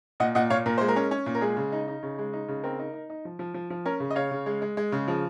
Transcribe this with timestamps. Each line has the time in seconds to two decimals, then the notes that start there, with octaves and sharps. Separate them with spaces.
0.20 A#2 D#5 F#5
0.35 A#2 D#5 F#5
0.50 A#2 C#5 F5
0.66 A#2 A#4
0.78 G#3 C5
0.88 A#4
0.96 C#4
1.11 C#4
1.26 A#2
1.35 A#4
1.41 G#3 G#4
1.57 C#3
1.72 D#4
1.88 D#4
2.03 C#3
2.19 G#3
2.33 D#4
2.49 C#3
2.63 C4 A#4
2.79 D#4
2.93 D#4
3.09 D#4
3.25 F3
3.39 F3
3.54 F3
3.70 F3
3.85 C#4 A#4
4.00 C#3
4.11 D#5
4.15 C#3 C#5 F5
4.31 C#3
4.46 G#3
4.62 G#3
4.77 G#3
4.92 C#3
5.08 F3